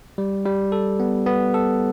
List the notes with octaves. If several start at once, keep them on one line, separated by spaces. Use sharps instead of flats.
G3
G3
A4
B3
B3
A4